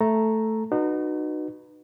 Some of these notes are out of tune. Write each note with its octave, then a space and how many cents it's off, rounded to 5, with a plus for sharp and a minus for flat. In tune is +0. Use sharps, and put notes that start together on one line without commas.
A3 +0 A4 +0 A#5 +0
D#4 -30 F#4 -5 B4 +0